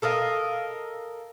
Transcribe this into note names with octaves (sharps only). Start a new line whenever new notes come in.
A4 A#4 D#5 F5